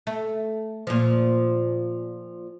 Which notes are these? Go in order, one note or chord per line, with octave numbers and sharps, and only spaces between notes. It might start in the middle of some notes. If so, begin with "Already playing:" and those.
A3
A#2 F3